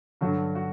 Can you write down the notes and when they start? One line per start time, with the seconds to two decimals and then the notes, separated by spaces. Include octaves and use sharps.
0.21 G2 D3 F#3 F#4
0.55 F#4